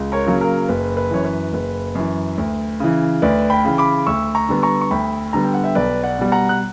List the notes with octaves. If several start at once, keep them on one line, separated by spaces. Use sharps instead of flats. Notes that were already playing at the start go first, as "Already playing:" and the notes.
Already playing: C#2
A#4 C#5
C#3 F#3 A#3
A#4
F#1 B4
B4
F#2 E3 C#5
B4
F#1 B4
F#2 E3
D2
C#3 E3
D2 B4 D5
G5 B5
C#3 E3
B5 D6
D2 C#6 E6
A#5 C#6
D3 G3 B3
A#5 C#6
C#6
D2 G5 B5
D3 G3 B3 A#5
G5
F#5
E5 G5
B1 B4 D5
D5 F#5
B2 G3
F#5 A#5
F#6